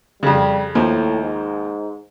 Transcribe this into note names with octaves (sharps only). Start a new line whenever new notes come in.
F2 C#3 G3
D#2 A2 F3
G#2